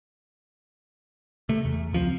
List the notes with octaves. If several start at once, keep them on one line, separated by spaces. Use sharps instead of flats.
C3 A3
E2
C#2 F3 C4